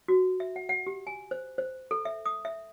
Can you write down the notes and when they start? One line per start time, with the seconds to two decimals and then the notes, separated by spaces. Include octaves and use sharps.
0.08 F#4
0.40 E5
0.56 F#5
0.69 F#5
0.87 G4
1.07 G#5
1.31 C5
1.58 C5
1.91 A4
2.05 E5
2.26 D#6
2.45 E5